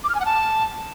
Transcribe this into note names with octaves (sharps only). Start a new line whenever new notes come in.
D6
F6
G#5
F#5
A5